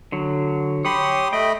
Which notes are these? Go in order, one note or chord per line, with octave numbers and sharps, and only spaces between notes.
D3 F#3
G4 C#5 B5 C6 D#6
A3 D#5 G5 B5